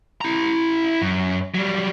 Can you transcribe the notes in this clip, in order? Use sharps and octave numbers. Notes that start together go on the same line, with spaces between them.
E4 A#5
F#2
F#3 G3